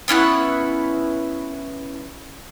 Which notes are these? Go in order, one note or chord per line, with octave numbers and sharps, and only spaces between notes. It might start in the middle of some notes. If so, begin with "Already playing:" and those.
B3 C#4 E4 F#5